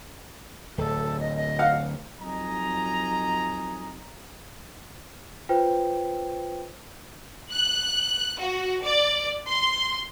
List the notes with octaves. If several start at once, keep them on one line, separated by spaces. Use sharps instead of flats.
D1 A4
D#5
D#5
F5 F#5
F2 F#3 D#4 D#5 G#5 A#5
F4 B4 C5 G5
F#6
F#4
D5
C6